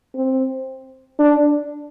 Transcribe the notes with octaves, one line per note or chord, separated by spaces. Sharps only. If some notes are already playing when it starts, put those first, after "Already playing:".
C4
D4